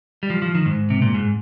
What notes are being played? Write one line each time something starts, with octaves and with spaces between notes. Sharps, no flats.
G3
F3
F3
D#3
G#2
C3
A#2
G#2